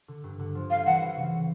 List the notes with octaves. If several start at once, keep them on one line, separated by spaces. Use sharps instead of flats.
D3
G2
D3
F3
G3 F5
E3 F#5
E3
C#3